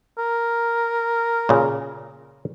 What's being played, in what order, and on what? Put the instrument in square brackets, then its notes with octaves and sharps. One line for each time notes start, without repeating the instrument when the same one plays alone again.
[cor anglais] A#4
[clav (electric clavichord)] A#2 C#3